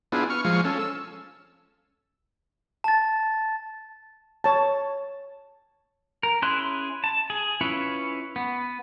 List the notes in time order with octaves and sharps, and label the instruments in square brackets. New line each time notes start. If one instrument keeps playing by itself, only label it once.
[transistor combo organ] B3 D4 E4 F4 G#4
C#6 F6
F3 G#3 F5 C#6
C#4 A4
E6
[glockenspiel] A5 A6
[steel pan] C#5 A5
[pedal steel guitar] A#4
C#4 E4 G#4 C6 F#6
A5
G#4
C#4 E4 F4 B4 C#5
B3